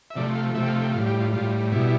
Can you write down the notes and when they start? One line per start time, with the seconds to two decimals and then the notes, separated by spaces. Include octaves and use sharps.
0.10 E5
0.16 C3 F3 A3 D5
0.35 F5
0.54 C3 F3 A3 E5
0.63 G5
0.68 F5
0.82 G5
0.94 A2 F5
0.98 G3
1.07 G4
1.20 F4
1.33 A2 G3 F4
1.72 B2 G3 E4